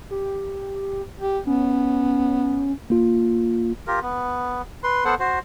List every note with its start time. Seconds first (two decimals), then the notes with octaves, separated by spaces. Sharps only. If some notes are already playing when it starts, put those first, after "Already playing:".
0.11 G4
1.20 G4
1.46 B3 C#4
2.90 A#3 F4
3.87 F4 G4 A#4
4.02 B3
4.83 B4 C6
5.05 B3 A4 C5 F#5
5.19 F#4 C5